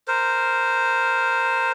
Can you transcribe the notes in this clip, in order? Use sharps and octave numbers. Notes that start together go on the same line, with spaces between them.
A#4 C5